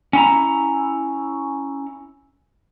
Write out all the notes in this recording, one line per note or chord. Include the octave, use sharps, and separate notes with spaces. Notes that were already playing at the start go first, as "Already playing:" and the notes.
C#4 E4 A#5